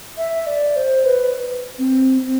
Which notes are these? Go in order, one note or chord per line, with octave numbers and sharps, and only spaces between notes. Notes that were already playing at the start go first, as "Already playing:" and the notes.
E5
D5
C5
B4
C4
C4